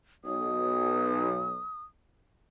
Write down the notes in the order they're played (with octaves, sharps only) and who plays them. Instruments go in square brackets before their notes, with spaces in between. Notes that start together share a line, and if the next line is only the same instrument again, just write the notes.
[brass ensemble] B1 [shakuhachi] D#6